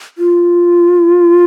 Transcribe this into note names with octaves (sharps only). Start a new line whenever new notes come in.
F4